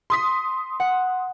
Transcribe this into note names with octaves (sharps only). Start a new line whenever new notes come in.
C6 D#6 B6
F#5